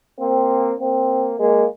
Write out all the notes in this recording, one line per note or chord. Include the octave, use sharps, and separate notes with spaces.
A#3 C4
A#3 C4
G#3 A#3